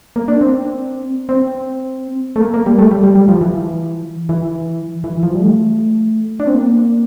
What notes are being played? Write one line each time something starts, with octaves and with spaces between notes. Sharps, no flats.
A#3
D4
C4
C4
A3
A#3
A#3
G3
A3
G3
G3
G3
F3
E3
E3
E3
F3
G3
A3
D4
C4
A#3